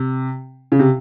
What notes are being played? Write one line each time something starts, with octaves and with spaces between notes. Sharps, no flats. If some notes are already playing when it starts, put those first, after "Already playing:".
Already playing: C3
C#3
C3